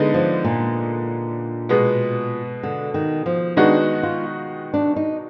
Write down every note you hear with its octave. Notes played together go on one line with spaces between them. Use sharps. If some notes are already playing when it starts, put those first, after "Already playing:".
Already playing: D3 G#3 B3 D#4
F3
A#2
B2 G#3 B3
D3
D#3
F3
D#3 G#3 B3 D4 D#4 F#4
F4
D4
D#4